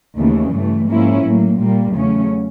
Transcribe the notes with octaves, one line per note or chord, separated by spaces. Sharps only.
D#2 C#3 E3 A3
G2 E3 A3
G#2 F3 A#3 C#4 E4
A2 F#3 A#3
A#2 G3 A#3
E2 C#3 F#3 A3 C#4